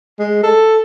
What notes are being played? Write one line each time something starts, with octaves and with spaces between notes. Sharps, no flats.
G#3
A4